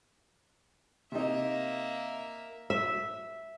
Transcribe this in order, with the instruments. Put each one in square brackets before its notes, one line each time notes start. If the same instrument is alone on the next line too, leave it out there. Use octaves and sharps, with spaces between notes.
[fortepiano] C3 D#4 [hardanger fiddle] A#3 E5
[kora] E5